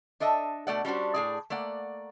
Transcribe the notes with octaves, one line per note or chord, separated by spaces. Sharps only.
D4 A4 D#5 E5
B2 A3 D5 F#5
G3 C#4 D4 F#4 C5
A2 G#4 D5
A3 A#3 D5 F#5